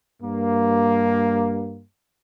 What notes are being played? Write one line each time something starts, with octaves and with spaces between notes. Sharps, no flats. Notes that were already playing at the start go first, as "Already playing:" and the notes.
G2 A#3